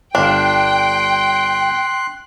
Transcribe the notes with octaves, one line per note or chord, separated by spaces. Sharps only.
G1 D4 F5 G5 C6 F#6